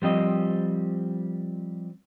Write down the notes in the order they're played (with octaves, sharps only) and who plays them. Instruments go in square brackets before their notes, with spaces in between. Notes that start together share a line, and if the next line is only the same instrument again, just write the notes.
[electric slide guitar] F3 G3 C4 D#5